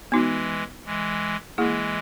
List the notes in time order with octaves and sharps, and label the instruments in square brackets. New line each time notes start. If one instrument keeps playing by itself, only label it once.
[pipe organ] E3 G#3 [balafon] B3 D#4 F#4
[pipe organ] E3 G#3
[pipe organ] E3 G#3 [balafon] A#3 E4 G#4